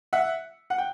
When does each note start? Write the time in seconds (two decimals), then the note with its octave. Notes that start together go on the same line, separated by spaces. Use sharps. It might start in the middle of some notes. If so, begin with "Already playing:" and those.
0.13 E5 F#5
0.70 F#5
0.78 G5